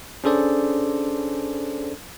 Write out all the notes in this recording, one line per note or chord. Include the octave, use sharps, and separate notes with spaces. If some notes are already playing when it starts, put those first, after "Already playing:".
C#4 D4 G#4 A4 C5 D5